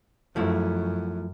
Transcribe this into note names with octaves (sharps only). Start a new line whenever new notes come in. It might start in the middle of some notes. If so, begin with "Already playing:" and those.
F#2 F3 A3 E4